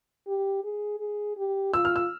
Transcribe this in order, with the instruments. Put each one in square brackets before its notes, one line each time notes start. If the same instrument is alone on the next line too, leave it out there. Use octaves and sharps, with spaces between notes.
[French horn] G4
G#4
G#4
G4
[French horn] F4 [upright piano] E6
[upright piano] F6
E6